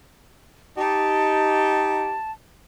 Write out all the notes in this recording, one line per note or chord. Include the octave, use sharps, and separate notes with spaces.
D#4 G4 A5